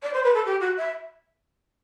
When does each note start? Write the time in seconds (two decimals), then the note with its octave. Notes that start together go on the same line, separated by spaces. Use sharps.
0.03 D5
0.13 C5
0.23 B4
0.34 A4
0.45 G4
0.60 F#4
0.77 E5